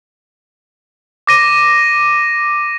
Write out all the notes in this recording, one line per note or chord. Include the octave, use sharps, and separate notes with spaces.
D6 A#6 D#7